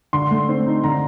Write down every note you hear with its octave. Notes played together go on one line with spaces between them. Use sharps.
D3 C6
A3
C4
D#4
D3 A#5